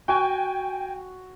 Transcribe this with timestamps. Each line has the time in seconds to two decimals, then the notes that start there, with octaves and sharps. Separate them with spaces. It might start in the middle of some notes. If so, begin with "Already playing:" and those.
0.08 F#4 G5 G#5